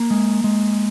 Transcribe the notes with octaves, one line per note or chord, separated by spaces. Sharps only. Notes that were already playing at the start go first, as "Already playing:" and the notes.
Already playing: A#3
G#3
G#3